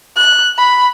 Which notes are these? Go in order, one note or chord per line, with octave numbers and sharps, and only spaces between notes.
F#6
B5